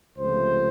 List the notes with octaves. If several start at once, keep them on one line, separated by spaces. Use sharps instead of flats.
C#2 C3 F3 A3 C5